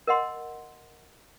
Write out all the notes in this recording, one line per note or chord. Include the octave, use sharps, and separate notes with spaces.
A#4 D#5 F#5 C6